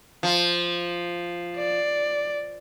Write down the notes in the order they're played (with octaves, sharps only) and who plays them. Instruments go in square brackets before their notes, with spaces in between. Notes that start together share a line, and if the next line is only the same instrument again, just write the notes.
[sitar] F3
[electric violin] D5